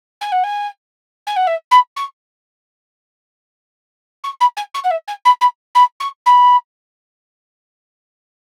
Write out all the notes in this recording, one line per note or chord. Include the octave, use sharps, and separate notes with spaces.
G#5
F#5
G#5
G#5
F#5
E5
B5
C#6
C#6
B5
G#5
C#6
F#5
E5
G#5
B5
B5
B5
C#6
B5